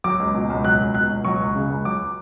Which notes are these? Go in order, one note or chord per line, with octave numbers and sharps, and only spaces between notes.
F#3 D6
C#2
B2
C#2
F#3 F#6
C#2
B2 F#6
C#2
F#3 C#6
C#2
C#3
C#2
F#3 D6